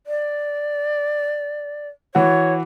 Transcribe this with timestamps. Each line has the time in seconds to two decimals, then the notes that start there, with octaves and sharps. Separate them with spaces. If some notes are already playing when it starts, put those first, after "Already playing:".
0.07 D5
2.15 E3 F#4 C#5